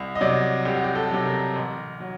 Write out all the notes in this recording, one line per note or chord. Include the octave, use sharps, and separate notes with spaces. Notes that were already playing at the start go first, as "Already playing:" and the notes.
Already playing: C2
D#5
C3 F#3 D5
C2 G4
F#4
G4
A4
C3 F#3
A#4
A1
F#3